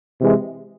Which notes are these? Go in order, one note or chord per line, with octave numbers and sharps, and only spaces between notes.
C3 E3 G#3